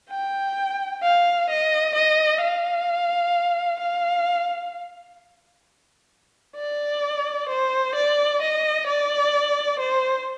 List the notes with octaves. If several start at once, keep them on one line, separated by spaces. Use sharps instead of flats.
G5
F5
D#5
D#5
F5
F5
D5
C5
D5
D#5
D5
C5